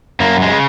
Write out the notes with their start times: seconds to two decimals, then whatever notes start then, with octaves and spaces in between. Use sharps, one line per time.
0.20 F#2 A#3
0.42 G#3
0.52 C#3